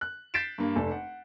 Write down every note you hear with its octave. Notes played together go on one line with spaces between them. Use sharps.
F#6
G6 A6 B6 C7 D7 E7
G2 A#3
F1 D4 A4
F#5